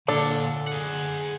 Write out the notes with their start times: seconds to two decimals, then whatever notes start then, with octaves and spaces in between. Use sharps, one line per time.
0.08 A#2 D3 D4 A4
0.67 G#4 F#5